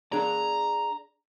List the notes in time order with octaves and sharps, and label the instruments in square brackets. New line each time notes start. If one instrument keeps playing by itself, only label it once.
[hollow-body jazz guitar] D4 G#4 D5 [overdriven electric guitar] A#5